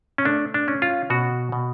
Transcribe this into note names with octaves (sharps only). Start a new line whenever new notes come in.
C#4
A3 D4
D4
C#4
F4
B2 F#4
B2